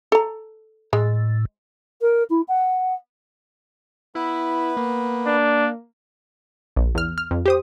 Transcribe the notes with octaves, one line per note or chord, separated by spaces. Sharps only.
A4 A#5
A2 G#3
A#4
E4
F#5
B3 E4 B4
A#3
D4
A#1
E2 F6
F6
F2
G4 C5 D#6